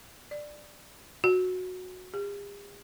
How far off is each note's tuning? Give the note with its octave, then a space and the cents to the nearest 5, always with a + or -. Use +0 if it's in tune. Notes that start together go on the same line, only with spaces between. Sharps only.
D5 +10
F#4 -10
G#4 -45